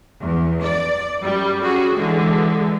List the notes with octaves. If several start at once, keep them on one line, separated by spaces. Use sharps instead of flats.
E2
D5
F#2 G3
C#4 F#4 G#4
D3 E3 G#3